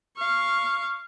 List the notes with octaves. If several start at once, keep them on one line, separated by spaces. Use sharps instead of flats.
F5 C#6